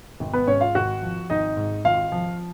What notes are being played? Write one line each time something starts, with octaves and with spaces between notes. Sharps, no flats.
G#1
B3 B4
G#2 C#4 C#5
F4 F5
G#1 F#4 F#5
F3
G#1 D#4 D#5
G#2
G#1 F4 F5
F3